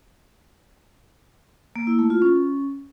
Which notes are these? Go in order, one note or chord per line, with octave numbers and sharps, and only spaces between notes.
A#3
E4
A3
F4
C#4